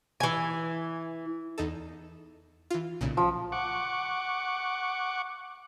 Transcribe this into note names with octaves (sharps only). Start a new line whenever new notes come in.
E3 G#5
E2 D#4 A4
E3 F4
B1 A#2 C#3
F3 C6
F#5 C#6 D6